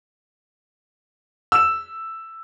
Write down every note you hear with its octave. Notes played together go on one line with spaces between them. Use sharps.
E6 E7